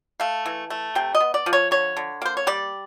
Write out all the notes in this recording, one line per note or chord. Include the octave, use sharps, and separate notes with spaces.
A3 F5
E3
A3
C3 G5
D#5
B3
D5
F3
C#5
D3 C#5
D3
A#3 C5
C#5
G3 D5